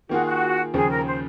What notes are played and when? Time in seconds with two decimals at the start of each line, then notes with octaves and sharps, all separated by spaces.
0.09 D#3 A#3 F4 F#4 G#4
0.26 F#4
0.74 D#2 C#3 F3 G#4
0.90 A#4
1.05 C5